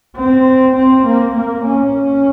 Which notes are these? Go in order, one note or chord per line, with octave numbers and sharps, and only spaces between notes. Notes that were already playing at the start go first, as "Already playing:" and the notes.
C4
C4
A#3
A#3
C#4